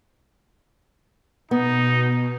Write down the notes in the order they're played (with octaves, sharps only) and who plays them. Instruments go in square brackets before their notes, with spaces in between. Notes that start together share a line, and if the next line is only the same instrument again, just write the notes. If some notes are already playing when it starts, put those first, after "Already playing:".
[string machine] B2 [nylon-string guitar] B3 [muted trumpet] D#4